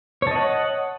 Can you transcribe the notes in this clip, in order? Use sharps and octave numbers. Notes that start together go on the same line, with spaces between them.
C#5 D#5 F#5 A5